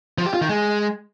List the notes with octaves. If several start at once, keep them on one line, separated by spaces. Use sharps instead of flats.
F3
G4
F4
D#3
G#3